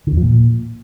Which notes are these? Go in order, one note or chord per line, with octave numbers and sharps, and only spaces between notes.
D3
E2
F3
A#2